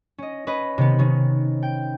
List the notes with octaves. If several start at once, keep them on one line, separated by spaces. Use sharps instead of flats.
C#4 D#5
C#4 B4 D#5 B5
C3 D#3 B3
D#3 C#4
G5